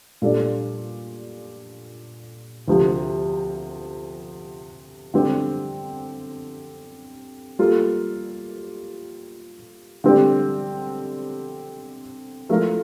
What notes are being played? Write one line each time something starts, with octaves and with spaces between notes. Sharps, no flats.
A#2 G3 D4 A4 D5
D2 C3 F3
D3 G3 C4 G4 C5
G3 A#3 F4 A4
D3 G3 C4 G4 D5
F3 A3 E4 A#4 F5